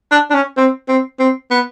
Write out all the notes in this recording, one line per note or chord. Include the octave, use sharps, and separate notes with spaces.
D4
D4
C#4
C4
C4
C4
B3